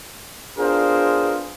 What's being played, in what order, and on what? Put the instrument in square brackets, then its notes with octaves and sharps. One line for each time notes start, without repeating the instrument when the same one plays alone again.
[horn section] B3 D4 F4 G#4 A#4 C5